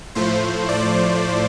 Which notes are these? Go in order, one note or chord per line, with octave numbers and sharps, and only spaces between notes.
A2 F3 A3 C5
D5